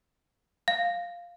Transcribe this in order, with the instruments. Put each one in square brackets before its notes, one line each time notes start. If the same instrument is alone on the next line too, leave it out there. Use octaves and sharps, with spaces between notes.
[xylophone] F5